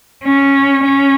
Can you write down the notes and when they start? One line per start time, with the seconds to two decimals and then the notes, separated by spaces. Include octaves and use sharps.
0.24 C#4
0.84 C#4